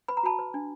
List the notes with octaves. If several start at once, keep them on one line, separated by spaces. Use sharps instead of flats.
B4 B5
A#5
F#4 A5 B5
B4
D4